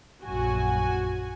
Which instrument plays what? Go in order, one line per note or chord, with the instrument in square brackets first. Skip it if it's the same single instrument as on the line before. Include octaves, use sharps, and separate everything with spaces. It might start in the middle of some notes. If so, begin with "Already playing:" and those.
[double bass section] A#1 F#2 [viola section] F#4 G#5